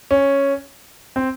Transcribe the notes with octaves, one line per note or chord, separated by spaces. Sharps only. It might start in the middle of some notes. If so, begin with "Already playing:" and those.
C#4
C4